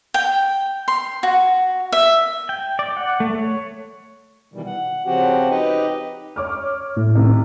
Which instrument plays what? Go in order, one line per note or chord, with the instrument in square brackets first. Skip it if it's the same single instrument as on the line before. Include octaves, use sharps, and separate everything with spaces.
[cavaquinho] G5
C6
F#4
E5
[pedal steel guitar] G5
D5
F#5
A3
C#5
[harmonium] B2 D#3 E3 G3
F#5
C#3 F3 C4 F#4 G4 F#5
D#4 G4 B4 D#5
[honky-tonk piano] C#5 D6 F6
[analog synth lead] A2
[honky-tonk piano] C3 D#3